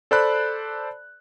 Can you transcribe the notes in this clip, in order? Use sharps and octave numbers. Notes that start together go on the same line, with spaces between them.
A4 C5 D5 A5 B5 F#6